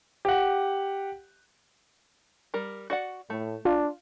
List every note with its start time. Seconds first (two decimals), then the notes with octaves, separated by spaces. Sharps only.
0.25 G4 F#5
2.54 G3 A#4
2.90 F#4 D5 F#5
3.30 A2 A3
3.65 D4 F4